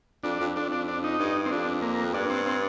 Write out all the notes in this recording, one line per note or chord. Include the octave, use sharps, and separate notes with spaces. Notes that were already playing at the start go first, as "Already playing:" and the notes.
F2 D4
F2
F2 D4
D4
D4
D#4
G2
C4
F2 D4
A#3
G2 D4
C4
C4